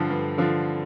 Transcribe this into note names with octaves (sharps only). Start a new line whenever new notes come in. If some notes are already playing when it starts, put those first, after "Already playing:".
Already playing: G2 D3 F3
G2
D3 F3